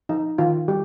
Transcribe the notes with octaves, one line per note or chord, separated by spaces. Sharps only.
F3 D#4
D#3 F4
G3 G4